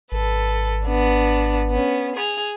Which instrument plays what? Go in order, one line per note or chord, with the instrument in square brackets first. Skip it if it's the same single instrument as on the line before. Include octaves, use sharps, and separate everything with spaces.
[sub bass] G#1 [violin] A4 B4
[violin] B3 D4
B3 C#4
G#4 F7